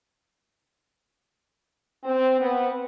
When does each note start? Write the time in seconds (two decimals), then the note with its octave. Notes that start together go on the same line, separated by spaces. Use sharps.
2.04 C4
2.40 B3